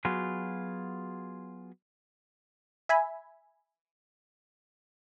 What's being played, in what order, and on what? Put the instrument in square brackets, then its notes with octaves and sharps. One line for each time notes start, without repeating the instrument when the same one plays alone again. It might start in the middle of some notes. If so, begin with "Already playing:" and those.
[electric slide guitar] F#3 B3 F4 F#4 G#4
[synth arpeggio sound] E5 G#5 B5